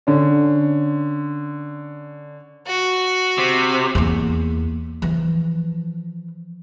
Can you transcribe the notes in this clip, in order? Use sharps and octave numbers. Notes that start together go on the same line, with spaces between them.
D3 C#4
F#4
C3
E2 A#3
E3 F3